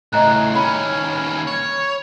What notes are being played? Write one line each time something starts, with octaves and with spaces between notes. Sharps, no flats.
A2 C#3 D#5 A#5 F#6
D#2 C#4 B5
C#5